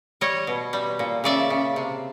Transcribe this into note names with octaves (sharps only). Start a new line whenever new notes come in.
G3 C#5 D#5
B2
G3
A#2
C#3 D5 E5
C#3
C3